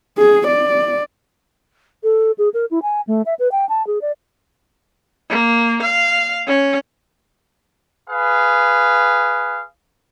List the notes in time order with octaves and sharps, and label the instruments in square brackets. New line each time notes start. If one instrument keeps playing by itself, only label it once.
[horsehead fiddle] G#4
D5
[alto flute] A4
G#4
A#4
E4
G#5
A3
E5
B4
G5
A5
G#4
D5
[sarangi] A#3
F5
C#4
[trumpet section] G#4 B4 F5